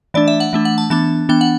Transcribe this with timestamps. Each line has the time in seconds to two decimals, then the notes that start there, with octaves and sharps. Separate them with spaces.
0.14 E3 A3 D4 D5
0.28 E5
0.40 F#5
0.53 E3 A3 D4
0.65 F#5
0.78 A5
0.90 E3 B3 D4 A5
1.29 E3 B3 D4 G5
1.41 F#5